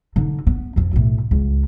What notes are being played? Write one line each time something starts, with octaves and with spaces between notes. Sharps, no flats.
D3 D#4
B3
F2 F3
B1 A2
C#2